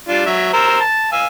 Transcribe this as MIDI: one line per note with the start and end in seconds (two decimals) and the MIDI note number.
0.09 0.26 55
0.09 0.26 62
0.09 0.26 65
0.26 0.49 54
0.26 0.49 76
0.53 0.79 70
0.53 0.79 72
0.53 0.79 88
0.81 1.10 81
1.12 1.27 77
1.12 1.27 80
1.12 1.27 88